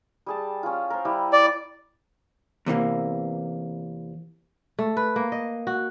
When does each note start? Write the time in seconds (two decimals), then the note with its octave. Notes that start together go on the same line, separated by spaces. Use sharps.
0.26 G3 G#4 A5
0.63 C#4 F4
0.90 A#4 C5
1.05 G3 E4 G4
1.33 D5
2.66 E2 C3 E3 A#3
4.79 A3
4.97 B4
5.16 A#3
5.32 D#5
5.67 F#4